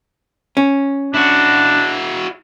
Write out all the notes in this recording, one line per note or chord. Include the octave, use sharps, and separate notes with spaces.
C#4
D4 E4 F#4